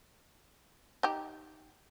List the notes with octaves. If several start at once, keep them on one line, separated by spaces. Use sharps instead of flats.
D#4 G4